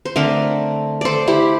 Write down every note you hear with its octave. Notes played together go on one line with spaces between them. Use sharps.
C5
D3 A3 C4 A#4 D5
A4 C5 D5
E4 G4